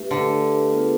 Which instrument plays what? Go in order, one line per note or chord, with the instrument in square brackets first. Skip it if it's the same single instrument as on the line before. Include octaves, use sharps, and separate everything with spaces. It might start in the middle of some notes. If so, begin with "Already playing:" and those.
Already playing: [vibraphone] A3 D4 G4 B4 E5
[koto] D3
[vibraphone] B3 D4 F4 G#4 B4